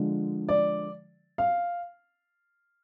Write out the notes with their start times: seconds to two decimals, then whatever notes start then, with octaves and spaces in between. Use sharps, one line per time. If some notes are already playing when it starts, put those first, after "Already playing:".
Already playing: D3 F3 G#3
0.49 D5
1.38 F5